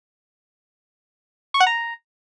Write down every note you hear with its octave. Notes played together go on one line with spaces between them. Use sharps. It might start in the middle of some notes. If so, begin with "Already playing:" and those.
C#6
F#5
A#5